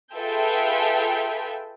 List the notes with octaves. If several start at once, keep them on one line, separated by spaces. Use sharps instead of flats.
F4 G#4 A4 B4 E5 G5